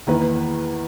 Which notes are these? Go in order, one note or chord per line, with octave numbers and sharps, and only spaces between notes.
E2 D#3 A#3 E4 B4